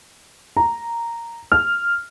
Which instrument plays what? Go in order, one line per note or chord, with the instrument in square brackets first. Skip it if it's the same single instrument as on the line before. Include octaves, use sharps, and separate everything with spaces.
[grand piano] A#5
F6